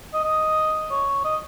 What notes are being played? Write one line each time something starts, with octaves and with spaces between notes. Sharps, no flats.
D#5
D#5
C#5
D#5